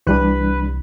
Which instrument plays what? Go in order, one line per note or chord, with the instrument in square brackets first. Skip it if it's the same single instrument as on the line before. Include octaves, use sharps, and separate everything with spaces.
[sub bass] C2 [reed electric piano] E3 G3 D4 [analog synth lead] B4